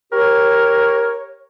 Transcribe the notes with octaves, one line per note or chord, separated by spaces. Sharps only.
G4 A#4 C#5